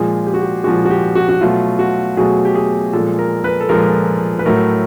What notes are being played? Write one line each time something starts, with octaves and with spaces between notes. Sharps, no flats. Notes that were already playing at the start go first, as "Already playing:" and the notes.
Already playing: A#2 F3 G#3 G#4
G4
F#4
G4
A#2 F3 G#3 F#4
F#4
G4
F#4
F#4
B2 F#3 A3 F4
F#4
B2 F#3 A3 G#4
G4
G#4
A#2 F3 G#3 A4
A#4
B4
A4
A#2 F3 G#3 A#4
B4
A2 F#3 A3 A#4